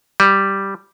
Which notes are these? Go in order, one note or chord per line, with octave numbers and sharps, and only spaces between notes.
G3